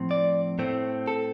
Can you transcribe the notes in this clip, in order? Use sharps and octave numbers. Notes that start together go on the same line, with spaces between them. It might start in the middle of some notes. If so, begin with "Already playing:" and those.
Already playing: A2 F3 C4
D5
A2 A3 C4
A4